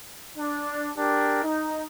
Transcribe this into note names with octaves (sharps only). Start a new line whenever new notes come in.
D4
D4 G4 A#4
D#4